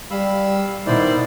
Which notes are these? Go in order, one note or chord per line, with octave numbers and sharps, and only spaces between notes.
G3 F5 B5 E6
B2 D#3 D#4 E4 C5 D5